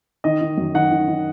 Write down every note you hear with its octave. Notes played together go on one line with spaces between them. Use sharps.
D#3 D#5
D#3
F#2
D#3 F#5
D#3
D#3